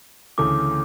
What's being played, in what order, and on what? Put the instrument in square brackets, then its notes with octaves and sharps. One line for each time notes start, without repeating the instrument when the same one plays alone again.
[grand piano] D2 C#3 E3 A3 [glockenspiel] D6